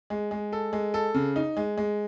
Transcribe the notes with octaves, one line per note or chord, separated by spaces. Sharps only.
G#3
G#3
A4
G#3
A4
C#3
D#4
G#3
G#3